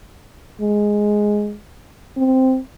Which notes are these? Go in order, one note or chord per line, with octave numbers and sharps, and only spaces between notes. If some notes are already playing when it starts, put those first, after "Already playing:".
G#3
C4